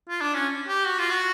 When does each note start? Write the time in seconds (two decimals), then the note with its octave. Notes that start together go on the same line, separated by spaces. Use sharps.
0.09 F4
0.22 D4
0.35 C#4
0.68 G4
0.87 F#4
0.99 F4
1.10 F#4